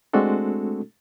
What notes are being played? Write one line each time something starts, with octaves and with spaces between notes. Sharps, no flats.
G#3 A3 C4 D4 F#4 A4